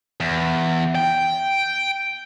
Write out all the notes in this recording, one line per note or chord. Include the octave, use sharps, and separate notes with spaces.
E2
G5